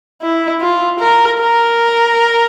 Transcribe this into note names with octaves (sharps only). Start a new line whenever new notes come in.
E4
F4
A#4
A#4